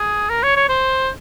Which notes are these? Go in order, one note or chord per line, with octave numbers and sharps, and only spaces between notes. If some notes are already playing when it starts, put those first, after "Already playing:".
Already playing: G#4
A#4
C#5
C#5
C5